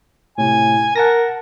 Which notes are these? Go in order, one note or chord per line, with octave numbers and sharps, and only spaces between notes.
A2 C3 G#5
A#4 F#5 A5 A#6